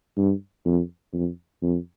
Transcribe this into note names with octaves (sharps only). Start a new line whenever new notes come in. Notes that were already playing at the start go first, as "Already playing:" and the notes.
G2
F2
F2
F2